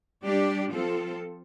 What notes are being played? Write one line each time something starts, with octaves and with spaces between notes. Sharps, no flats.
G3 D4 G4 D5
F3 C4 F4 A4